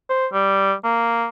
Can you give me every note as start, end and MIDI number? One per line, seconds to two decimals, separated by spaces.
0.09 0.27 72
0.32 0.74 55
0.84 1.28 58